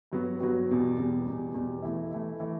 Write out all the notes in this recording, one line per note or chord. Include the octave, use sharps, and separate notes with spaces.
G2 F#3 B3 F#4
G2 F#3 B3 F#4
E2 B2 G3
E2 B2 G3
E2 B2 G3
E2 B2 G3
E3 A3 E4
E3 A3 E4
E3 A3 E4